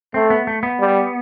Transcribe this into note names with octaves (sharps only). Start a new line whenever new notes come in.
A3 C4
B3
A3
B3
G3